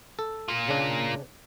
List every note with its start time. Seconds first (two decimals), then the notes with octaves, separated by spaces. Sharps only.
0.19 A4
0.48 A#3 F4
0.68 C#3 D4